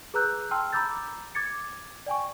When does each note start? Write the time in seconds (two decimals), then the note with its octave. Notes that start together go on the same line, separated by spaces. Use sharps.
0.14 G#4 B4 A#5 E6 F#6 G6
0.51 G5 A5 C6 E6 F6
0.73 A#5 B5 D6 E6 G6 A6
1.35 D6 G#6 A6 C#7
2.06 D5 G5 G#5 C#6